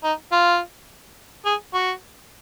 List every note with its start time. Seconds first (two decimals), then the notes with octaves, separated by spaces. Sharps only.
0.04 D#4
0.32 F4
1.46 G#4
1.74 F#4